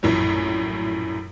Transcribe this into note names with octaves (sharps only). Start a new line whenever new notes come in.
A#1 F#2 A2 E3 F#3